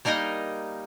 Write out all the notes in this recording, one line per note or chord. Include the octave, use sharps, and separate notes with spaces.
G3 A#3 D#4 A#4 D#5